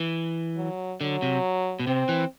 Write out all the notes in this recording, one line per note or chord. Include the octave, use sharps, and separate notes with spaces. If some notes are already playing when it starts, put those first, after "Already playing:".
Already playing: E3
F#3
D3 F#3
C3
B2
C3 C4
E3